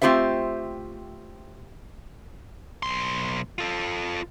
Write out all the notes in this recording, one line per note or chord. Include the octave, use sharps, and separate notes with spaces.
A3 C4 F4 G4 C5 E5
B1 C6
F4 A4